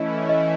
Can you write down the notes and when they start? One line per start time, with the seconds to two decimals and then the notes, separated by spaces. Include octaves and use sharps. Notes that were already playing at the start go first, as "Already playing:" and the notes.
Already playing: E3 A3 C#4 E4 D#5
0.29 D#5